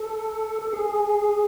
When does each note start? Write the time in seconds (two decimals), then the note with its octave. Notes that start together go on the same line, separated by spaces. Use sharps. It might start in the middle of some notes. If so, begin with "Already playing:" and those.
Already playing: A4
0.63 A4
0.73 G#4